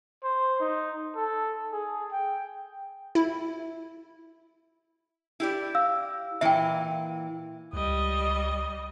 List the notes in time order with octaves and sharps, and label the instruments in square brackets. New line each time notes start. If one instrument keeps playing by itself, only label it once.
[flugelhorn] C5
D#4
A4
G#4
G5
[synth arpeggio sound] E4
[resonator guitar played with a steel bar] E4 G4 D5
[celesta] F5 E6
[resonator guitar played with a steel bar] A#2 E3 [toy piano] E5 G5
[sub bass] C#2 [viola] G3 D#5